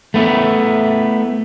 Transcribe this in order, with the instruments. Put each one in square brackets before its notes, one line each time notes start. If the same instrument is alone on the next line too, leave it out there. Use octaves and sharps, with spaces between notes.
[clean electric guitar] A3 B3 E4